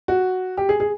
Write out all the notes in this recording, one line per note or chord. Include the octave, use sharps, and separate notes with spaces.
F#4
G4
G#4
G#4